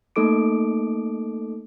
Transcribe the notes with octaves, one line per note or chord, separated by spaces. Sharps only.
A3 A#3 D#4 A4 D6 D7